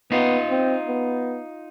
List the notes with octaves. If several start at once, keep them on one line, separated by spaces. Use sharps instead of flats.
B3 D#4 F4
C4
B3